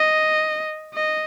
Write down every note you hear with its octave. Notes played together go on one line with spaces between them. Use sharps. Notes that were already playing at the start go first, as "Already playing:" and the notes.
Already playing: D#5
D#5